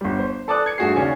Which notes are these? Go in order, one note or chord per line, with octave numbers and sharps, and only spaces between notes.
G1 G3
C5
A4 D5 A5 D6 D#6 F#6
G#6 C#7
G2 A3 F#4 G#4 C7
D#2 C#3 C#4 D5 G#5